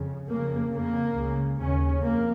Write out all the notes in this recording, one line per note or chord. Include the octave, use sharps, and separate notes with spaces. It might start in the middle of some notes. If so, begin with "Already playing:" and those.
Already playing: F2 C#3
F2 C#3 A#3
F2 C#3 A#3
C#2 C#3
D#2 C#3 C#4
F2 A#3